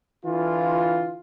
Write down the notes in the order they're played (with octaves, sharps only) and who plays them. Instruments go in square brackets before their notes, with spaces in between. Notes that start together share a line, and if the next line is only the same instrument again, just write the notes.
[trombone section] D3 E3 F4